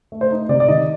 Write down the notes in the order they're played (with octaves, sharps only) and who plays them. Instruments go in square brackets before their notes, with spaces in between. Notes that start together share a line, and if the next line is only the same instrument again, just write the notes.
[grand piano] A3
C5
D#4
C3 D5
D5
D#3 D#5